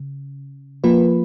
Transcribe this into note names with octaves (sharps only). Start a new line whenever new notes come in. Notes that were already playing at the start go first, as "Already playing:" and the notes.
Already playing: C#3
F3 A#3 F4 B4